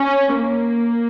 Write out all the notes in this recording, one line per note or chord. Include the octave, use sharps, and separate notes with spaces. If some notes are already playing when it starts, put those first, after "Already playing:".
Already playing: C#4
A#3